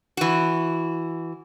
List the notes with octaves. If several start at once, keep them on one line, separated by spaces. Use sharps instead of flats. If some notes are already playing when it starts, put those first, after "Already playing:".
E3 F#4